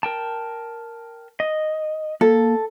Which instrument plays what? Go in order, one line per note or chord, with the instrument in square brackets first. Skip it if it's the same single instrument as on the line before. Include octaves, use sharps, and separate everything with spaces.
[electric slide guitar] A#4 G5 A5
D#5
[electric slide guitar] A#3 [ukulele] A4